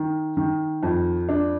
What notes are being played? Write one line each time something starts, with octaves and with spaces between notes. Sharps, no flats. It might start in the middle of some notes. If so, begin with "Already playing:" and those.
Already playing: D#3
D#3
F2
D4